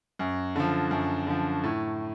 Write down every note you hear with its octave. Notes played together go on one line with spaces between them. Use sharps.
F#2
D3 F3
F#2
D3 F3
A2